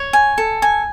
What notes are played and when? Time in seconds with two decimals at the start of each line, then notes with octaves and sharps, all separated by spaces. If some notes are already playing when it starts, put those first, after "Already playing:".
Already playing: C#5
0.13 G#5
0.38 A4
0.62 G#5